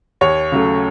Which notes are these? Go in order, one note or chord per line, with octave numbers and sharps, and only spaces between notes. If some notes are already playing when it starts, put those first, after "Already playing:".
D#2 C#5
C#3 F#3 A3